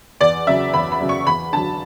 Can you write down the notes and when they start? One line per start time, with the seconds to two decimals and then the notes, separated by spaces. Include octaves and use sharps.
0.20 E2 D5
0.47 C#3 F#3 E5
0.73 E2 B5
0.92 B5
1.00 C#3 F#3
1.09 C#6
1.26 E2 B5
1.53 D3 A5
1.56 F#3